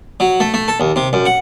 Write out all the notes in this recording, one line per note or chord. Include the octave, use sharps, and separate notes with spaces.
F#3
A3
A3
A4
D#2
C3
F#2
F#5